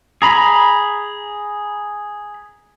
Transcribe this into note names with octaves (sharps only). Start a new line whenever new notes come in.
G#4 A#5 B5